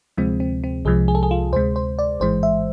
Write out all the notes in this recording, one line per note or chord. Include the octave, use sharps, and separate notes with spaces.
D2 C3 F3 G#3 C4
C4
C4
C2 C3 F3 G#3 G#4
G#4
A4
G#4
F4
D2 C3 G#3 C5
C5
D5
A1 G#2 E3 G#3 C5
E5